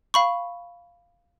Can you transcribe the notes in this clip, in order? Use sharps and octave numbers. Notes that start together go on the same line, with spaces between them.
F5 B5 C#6